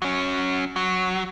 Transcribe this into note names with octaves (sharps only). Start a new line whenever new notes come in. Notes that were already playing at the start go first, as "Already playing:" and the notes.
F#3 C#4
F#3